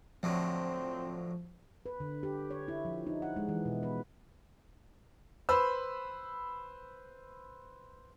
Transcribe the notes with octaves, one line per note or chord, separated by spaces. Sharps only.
A2 D3 F3 F#3 C4
B4
D3
G4
C#5
E4
F3
D#4
F#5
G#3
E3
B2
B4
B4 C5 B5 E6